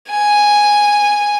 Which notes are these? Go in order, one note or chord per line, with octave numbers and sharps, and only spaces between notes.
G#5